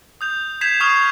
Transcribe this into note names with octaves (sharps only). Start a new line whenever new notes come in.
D#6 G6 F7
G6 G#6 B6 C7 E7 F7
C#6 D#6 F6 G#6 C7 F7